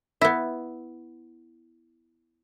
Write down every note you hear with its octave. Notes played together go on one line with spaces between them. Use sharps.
B3 E4